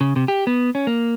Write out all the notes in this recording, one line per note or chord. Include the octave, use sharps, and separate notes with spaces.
C#3
C3
G4
B3
C#4
A#3